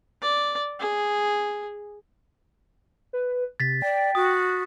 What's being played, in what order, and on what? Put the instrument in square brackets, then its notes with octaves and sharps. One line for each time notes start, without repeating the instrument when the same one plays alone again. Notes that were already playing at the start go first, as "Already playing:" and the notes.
[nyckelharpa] D5
G#4
[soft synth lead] B4
[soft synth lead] C3 [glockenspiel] A6 B6
[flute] D5 [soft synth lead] G5
[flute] F#4 [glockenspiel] D#6